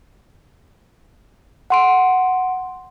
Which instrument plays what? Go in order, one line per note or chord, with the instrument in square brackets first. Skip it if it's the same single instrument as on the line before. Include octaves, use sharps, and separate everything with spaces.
[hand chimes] F#5 C6 D7